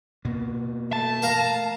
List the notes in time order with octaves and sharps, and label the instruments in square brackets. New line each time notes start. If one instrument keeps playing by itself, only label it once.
[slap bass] B2 A#3
[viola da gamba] A3 [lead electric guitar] A5
[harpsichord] A#4 F5 A#5